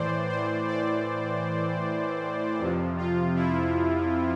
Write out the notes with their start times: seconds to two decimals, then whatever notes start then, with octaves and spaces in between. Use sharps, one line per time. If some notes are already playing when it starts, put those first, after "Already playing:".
Already playing: A2 E3 C5 D5
0.29 C5
0.68 D5
2.59 F2 C3 F3
2.97 F4
3.36 E4